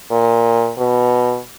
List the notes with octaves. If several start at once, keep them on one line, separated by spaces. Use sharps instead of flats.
A#2
B2